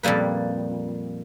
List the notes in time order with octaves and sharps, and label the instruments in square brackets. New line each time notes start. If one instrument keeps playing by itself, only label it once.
[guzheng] F2 A#2 G3 A#3 B4